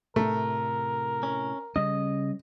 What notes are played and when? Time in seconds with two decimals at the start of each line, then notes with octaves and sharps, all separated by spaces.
0.16 A2 C3 A3 A#4
1.23 C#4
1.76 C#3 G3 C#4 D#5